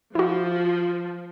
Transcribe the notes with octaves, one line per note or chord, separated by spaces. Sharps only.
F3 E4 F#4